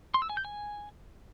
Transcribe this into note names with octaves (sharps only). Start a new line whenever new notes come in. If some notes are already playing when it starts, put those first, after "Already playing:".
C6
E6
G#5
G6
G#5